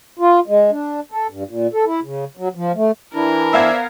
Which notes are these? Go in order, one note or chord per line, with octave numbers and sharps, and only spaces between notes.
F4
G#3
D4
A4
G2
A#2
A4
E4
C#3
F#3
F3
A3
E3 D4 E4 A#4
B3 C5 D5 E5 F5 G#6